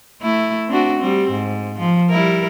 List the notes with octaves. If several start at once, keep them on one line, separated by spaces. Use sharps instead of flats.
A3 E4
C4 D4 F#4
G3 C4
G#2
F3
G3 E4 A#4